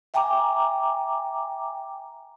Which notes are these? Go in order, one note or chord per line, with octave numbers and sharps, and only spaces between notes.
E5 G5 G#5 A#5 D6